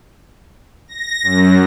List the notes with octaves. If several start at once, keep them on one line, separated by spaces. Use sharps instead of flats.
A#6
F#2